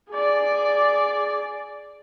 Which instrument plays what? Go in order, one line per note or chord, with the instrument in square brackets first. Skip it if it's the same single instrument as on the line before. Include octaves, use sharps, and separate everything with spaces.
[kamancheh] G#4 D5